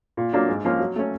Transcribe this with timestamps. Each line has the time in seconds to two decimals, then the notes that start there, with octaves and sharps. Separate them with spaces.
0.17 A#2
0.33 F#3 A#3 D4
0.49 G#2
0.65 F3 A#3 C#4 F4
0.79 F#3
0.96 A3 C#4